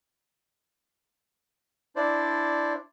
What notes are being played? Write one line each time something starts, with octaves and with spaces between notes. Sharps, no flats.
D4 E4 C5 D5